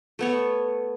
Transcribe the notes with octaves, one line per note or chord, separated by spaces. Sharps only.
A3 B3 C#5